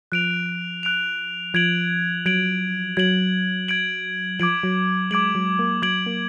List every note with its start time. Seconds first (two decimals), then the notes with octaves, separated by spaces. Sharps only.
0.12 F3 F#6 D7 F7
0.83 F#6 D7 F7
1.54 F3 G#6 D7 F#7
2.26 F#3 G#6 D7 F#7
2.97 F#3 G#6 D7 F#7
3.68 G#6 D7 F#7
4.39 F3 D6 G#6 D7 F#7
4.63 F#3
5.11 G#3 D6 G#6 D7 F#7
5.35 F#3
5.59 A#3
5.82 F#3 D6 G#6 D7 F#7
6.06 A#3